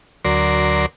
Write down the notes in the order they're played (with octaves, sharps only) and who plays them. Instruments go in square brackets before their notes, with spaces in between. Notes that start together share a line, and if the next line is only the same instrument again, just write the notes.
[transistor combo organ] D2 F#3 A#4 D5 C6